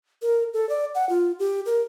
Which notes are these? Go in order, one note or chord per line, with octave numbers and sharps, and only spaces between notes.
A#4
A4
D5
F#5
F4
G4
A#4